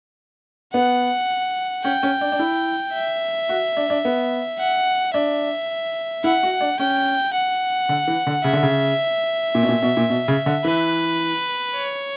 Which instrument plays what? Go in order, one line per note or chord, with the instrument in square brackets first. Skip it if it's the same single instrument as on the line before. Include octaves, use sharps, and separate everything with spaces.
[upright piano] B3 [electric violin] F#5
[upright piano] C#4 [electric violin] G5
[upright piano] C#4
D4
D4
E4
[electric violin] E5
[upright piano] F#4
D4
D4
B3
[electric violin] F#5
[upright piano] D4 [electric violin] E5
[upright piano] E4 [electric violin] F#5
[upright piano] F#4
D4
[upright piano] C#4 [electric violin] G5
[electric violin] F#5
[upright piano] D3
E3
D3
[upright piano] C#3 [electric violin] E5
[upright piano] D3
C#3
A#2
B2
A#2
B2
A#2
B2
C#3
D3
[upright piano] E3 [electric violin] B4
[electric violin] C#5